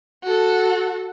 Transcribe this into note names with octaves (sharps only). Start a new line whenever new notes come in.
F#4 A4